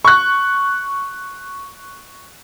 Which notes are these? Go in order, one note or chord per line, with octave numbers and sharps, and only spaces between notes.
C#6 F#6